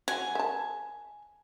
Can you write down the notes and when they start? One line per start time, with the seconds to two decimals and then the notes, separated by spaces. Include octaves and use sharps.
0.08 F#3 G#5
0.35 E5 A5